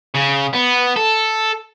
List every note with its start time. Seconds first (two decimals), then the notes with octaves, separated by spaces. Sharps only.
0.14 C#3
0.53 B3
0.96 A4